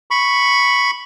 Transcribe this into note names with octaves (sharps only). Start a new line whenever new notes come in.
B5 C#6